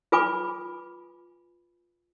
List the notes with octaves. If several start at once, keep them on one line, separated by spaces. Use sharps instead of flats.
F4 B4 G#5 B5 D6